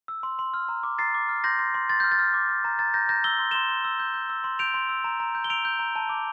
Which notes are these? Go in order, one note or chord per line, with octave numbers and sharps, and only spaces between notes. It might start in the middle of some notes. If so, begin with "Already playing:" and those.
E6
C6
C6
F6
A#5
D6
A#5 A6 C7
D6
F6
C6 G6 A#6
C6
C6
C6 A6
G6
F6
A6
F6
D6
F6
A#5
A#5 A6
A#5 G6 A#6
A#5 G6 A#6
E6 G7
C6
C6 E7 G7
C6
E6
G6
G6
E6
C6
G6 D7 F7
C6
E6
A#5
A#5
G6
G7
E6 D7 F7
G6
A#5
A5
D6